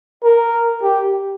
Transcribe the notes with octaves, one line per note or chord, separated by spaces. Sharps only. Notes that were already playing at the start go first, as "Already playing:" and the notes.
A#4
G4